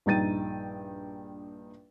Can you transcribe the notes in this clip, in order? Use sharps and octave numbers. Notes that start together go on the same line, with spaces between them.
A#1 G2 D#4 G5 A6 D#7